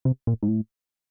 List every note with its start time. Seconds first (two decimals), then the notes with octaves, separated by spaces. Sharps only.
0.05 C3
0.27 A#2
0.43 G#2
0.48 A2